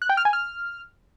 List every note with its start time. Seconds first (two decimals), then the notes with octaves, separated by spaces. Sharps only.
0.02 F#6
0.09 G5
0.17 F6
0.25 G#5
0.33 F6